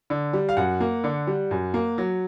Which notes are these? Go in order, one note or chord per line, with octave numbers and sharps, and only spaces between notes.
D3
G3
F5
F#2 F#5
A#3
D3
G3
F#2
A#3
F#3